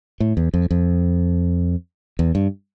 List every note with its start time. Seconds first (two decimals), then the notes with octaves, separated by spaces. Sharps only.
0.20 A2
0.37 E2
0.54 F2
0.71 F2
2.19 E2
2.35 G2